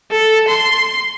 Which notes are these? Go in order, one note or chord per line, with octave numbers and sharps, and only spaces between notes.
A4
C6